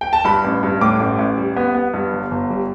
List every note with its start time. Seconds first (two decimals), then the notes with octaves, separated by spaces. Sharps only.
0.01 G5
0.13 A5
0.25 G2 B5
0.44 A1
0.63 G2
0.81 A2 D6
1.00 A1
1.19 A1
1.37 G3
1.56 B3
1.74 B3
1.94 G2
2.13 G1
2.31 G1
2.50 G3